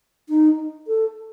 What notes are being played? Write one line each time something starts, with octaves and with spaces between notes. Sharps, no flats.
D#4
A4